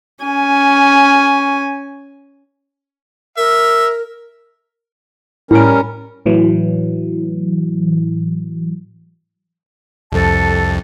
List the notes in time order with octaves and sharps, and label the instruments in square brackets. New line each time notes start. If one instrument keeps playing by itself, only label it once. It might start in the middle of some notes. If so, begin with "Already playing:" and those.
[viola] C#4 G#5
[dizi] A#4 [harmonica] E5
[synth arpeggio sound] A2 D7 [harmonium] G3 C#4 A#4
[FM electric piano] A2 E3 F#3
[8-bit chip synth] C2 F2 [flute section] A4 A5